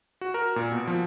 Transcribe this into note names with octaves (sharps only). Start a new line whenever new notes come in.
F#4
A#4
A#2
B2
F3